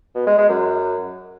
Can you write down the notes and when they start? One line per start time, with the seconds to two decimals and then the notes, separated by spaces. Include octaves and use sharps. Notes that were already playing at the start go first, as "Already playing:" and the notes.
0.15 B2
0.27 G#3
0.38 G#3
0.49 F#2